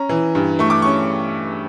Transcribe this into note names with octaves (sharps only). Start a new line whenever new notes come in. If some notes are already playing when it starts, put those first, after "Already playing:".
Already playing: C#4 A#5
E3
G2
A3 C#6
D6
C#4 C#6